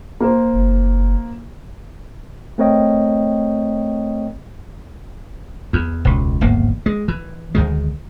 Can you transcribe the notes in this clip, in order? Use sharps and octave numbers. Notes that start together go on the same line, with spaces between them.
A#3 C5
F#1
A3 C4 A#4 C#5 D#5 G5
E2
E1 C#2
D1 G#1 E2 A#3
G#3
E3
D2 D#3 G#3